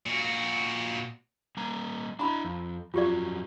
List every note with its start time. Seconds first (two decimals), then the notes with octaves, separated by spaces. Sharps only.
0.06 A#2 F#4
1.57 G3 A#3 A#5
2.19 D4 E4 A#5 B5
2.45 F2
2.94 F2 F#3 F4 G4 D5